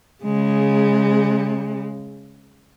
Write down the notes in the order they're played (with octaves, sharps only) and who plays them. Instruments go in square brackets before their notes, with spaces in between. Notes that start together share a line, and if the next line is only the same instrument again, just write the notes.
[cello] C#3 G#3